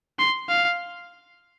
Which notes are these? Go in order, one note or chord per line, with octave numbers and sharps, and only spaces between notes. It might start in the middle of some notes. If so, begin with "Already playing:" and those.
C6
F5